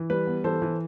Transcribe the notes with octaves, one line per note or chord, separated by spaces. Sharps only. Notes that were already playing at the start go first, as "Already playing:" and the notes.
Already playing: E3
G3 B4
B3
E3 A4 C5
E3